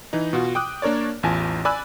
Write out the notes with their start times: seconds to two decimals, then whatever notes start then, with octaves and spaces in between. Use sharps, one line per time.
0.13 E3 D#4
0.33 B2 F4 F#4
0.55 G5 D6 D#6 F#6
0.82 A#3 D4 A#4 C#5 D5
1.23 A1 E2 F4 G#5 A5
1.65 D5 G#5 B5 E6 F#6